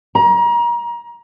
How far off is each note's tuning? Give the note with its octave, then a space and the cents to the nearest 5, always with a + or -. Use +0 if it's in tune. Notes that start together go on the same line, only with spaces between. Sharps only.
A#5 +30